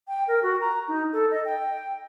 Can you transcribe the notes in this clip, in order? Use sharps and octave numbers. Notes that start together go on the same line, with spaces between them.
G5
A#4
F#4
A#5
D#4
A4
D#5
G5